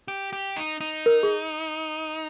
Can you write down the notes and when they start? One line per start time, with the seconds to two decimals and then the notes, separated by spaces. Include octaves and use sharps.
0.08 G4
0.33 G4
0.56 D#4
0.81 D#4
1.06 A#4
1.23 G#4